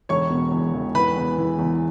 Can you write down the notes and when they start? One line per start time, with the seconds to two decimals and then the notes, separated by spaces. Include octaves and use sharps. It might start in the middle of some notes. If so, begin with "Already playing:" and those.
0.09 E1 C#5 C#6
0.30 B2
0.52 E2
0.74 E1
0.94 E3 B4 B5
1.16 E2
1.38 E3
1.59 E2